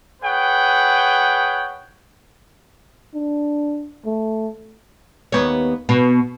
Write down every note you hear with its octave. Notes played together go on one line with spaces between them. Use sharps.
G#4 B4 C#5 F#5 G5
D4
A3
D#2 B3 C#5
B2 B3